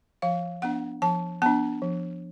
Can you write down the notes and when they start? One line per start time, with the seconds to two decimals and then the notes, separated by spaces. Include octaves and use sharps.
0.22 F3 F5
0.62 B3 D4 F#5
1.02 F3 A5
1.42 B3 D4 A5
1.82 F3